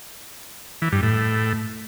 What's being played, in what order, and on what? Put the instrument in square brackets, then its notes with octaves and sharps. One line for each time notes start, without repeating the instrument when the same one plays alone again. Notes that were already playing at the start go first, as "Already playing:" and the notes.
[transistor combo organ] E3
G2
A2